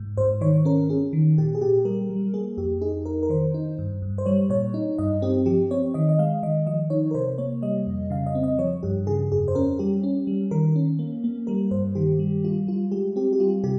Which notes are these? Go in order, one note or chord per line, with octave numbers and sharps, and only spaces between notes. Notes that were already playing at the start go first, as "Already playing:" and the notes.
Already playing: G#2
G#2 C5
D#3 C#5
C#4 A#4
C#4 G#4
D#3
A#2 G4
G#4
A#2 G4
G3 A#4
G3
A#3 G#4
F2 G4
D#4 G#4
D#4 A#4
A#4
D#3 C5
D#4
G2
G2
C5
G3 C#5
A#2 C#5
D#4
G2 D#5
C4 G4
F3 G4
C4 C#5
D#3 D#5
D#5
G#3 F5
D#3 D#5
F3 D#5
D#4 C#5
A#4
C3 C5
A#3 C#5
G3 D#5
F2
C#3 F5
D#5
C4
D#5
F3 C#5
G2 G4
C#3 G#4
F2 G#4
C5
C#4 A#4
G3 G4
C#4
G3
D#3 A#4
C#4
A#3
A#3
G3 A#4
G2 C5
D#3 G4
G3
G3 F4
G3 F4
G#3 G4
C4 G4
G4
G3 F4
C3 G4